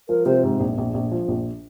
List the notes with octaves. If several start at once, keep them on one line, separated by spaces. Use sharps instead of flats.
F3 A#4
C3 C5
G#2
A#1
A#1
A#1
F3
A#1